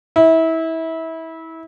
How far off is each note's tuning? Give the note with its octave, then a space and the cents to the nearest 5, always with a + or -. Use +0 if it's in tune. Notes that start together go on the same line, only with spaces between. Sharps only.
E4 -25